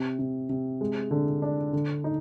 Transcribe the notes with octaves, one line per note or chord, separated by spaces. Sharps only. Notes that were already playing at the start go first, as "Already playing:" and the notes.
Already playing: C3
C3
C3
G#3
D3
D4
D3
D#4